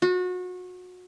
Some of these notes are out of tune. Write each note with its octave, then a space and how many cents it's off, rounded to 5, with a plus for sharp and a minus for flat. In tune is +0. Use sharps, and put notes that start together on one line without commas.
F#4 -30